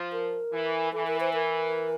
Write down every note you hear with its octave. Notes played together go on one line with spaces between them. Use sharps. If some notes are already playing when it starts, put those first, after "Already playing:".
Already playing: F3
A#4
E3
E3 A4
A#4
C5
A#4